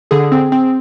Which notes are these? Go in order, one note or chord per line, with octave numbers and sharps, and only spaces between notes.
D3 G#4
C4
C4